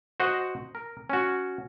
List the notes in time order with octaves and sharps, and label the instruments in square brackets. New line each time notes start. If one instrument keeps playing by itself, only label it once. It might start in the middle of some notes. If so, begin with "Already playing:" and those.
[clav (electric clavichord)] F#4 C5 D#5 F#5
A#4
C#4 F#4